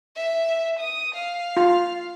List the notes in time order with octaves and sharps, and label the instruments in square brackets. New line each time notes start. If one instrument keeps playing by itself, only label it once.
[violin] E5
D#6
F5
[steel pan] F4